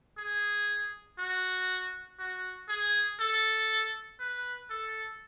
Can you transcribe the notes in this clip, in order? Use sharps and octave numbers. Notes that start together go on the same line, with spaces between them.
G#4
F#4
F#4
G#4
A4
B4
A4